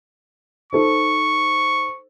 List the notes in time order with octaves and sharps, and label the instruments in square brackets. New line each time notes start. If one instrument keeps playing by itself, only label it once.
[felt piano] D#4 A4 C5 [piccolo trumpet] C#6